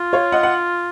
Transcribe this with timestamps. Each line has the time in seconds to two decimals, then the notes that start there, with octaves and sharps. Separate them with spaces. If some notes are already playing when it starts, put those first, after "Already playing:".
Already playing: F4
0.13 C#5 F5
0.32 D#5 F#5
0.43 F#5